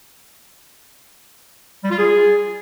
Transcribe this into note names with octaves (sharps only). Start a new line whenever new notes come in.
G3
F4
G#4